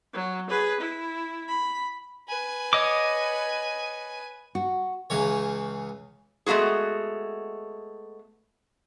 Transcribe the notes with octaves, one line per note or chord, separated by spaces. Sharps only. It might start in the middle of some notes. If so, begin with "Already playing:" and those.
F#3
G#4 B4
E4
B5
B4 G#5
C#5 D#5 D6
F#4
C#2 C#3 E3 C#5
G#3 A3 B3 F#4 G#4